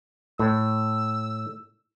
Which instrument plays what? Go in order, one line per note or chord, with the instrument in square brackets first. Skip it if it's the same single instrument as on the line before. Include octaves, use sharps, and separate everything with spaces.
[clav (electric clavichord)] A2 [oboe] E6